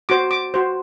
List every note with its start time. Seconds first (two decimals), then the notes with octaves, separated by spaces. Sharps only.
0.09 F#4 C5 D6
0.31 D6
0.54 F#4 C5